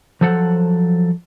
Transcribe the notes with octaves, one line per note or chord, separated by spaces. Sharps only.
F3 F#3 A4 C5 F#5